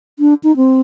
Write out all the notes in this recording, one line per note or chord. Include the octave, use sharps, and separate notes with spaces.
D4
D#4
C4